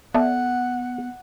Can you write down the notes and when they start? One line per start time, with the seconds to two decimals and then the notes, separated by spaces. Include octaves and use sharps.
0.14 B3 A4 D5 E5 F#5